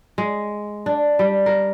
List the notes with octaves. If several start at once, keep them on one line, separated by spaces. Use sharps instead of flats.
G#3
D4
G3
A#4